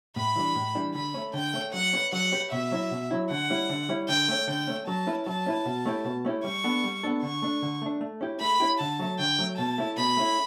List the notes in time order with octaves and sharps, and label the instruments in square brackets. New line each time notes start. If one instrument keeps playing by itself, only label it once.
[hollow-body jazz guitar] A2 [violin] B5
[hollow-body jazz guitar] E3 G3 D4
A2
E3 G3 D4
[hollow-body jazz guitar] D3 [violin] B5
[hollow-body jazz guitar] A3 C#4
[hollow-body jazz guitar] D3 [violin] G5
[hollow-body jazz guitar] A3 C#4
[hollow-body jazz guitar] F#3 [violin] F#5
[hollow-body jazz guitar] C#4 G4 B4
[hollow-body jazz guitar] F#3 [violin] F#5
[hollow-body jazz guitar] C#4 G4 B4
[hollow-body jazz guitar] B2 [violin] E5
[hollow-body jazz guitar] F#3 C#4 E4
B2
F#3 C#4 E4
[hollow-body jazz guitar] D3 [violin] F#5
[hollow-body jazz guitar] G3 C#4 E4
D3
G3 C#4 E4
[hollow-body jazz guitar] D3 [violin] G5
[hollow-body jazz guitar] A3 C#4
[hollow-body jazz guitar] D3 [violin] G5
[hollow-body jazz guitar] A3 C#4
[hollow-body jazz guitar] F#3 [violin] A5
[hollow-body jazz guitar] C#4 E4 B4
[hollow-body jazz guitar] F#3 [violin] A5
[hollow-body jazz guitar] C#4 E4 B4
B2
A3 C#4 E4 G4
B2
A3 C#4 E4 G4
[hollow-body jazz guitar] G3 [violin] C#6
[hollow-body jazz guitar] B3 D4 A4
G3
B3 D4 A4
[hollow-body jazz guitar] D3 [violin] C#6
[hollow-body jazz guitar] A3 D4
D3
A3 D4
A3
C#4 E4 G4
[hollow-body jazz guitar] A3 [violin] B5
[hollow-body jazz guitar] C#4 E4 G4
[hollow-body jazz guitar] D3 [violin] A5
[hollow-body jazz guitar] F#3 A3 C#4
[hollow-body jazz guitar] D3 [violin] G5
[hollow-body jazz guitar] F#3 A3 C#4
[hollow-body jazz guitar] B2 [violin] A5
[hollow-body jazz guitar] A3 C#4 E4
[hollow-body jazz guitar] B2 [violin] B5
[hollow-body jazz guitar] A3 C#4 E4